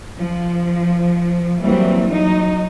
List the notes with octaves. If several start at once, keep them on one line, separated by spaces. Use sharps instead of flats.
F3
E3 F#3 G3 A#3 C4
F#3 D#4